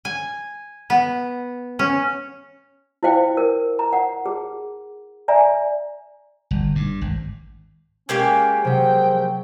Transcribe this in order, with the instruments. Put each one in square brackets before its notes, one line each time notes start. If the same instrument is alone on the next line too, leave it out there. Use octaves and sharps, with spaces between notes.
[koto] G#5
B3
C#4
[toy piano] E4 C5 F5 G5
A#4
A#5
F#5
G#4
D5 E5 G#5 A#5
[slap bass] G1
G2
G#1
[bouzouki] G#3 A#3 G4 [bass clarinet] C#4 [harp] G6
[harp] C3 F#3 [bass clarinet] F3 [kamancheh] G5